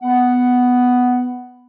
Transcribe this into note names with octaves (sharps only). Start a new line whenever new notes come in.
B3 F#5